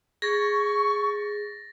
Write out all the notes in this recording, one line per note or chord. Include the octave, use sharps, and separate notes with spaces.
G#4 C#6 A6 A#6